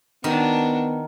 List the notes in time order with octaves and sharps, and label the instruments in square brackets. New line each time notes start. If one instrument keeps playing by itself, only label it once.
[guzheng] D#3 [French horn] B3 [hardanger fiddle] D4 F#4